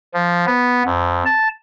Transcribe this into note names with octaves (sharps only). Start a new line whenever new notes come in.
F3
B3
F2
A5